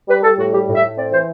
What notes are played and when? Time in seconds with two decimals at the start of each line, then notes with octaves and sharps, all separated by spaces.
0.08 G3 B4
0.23 G3 A4
0.38 A2 F#4
0.52 G3 G4
0.68 A2
0.75 E5
0.83 A2
0.97 C4 D5
1.12 E3 C5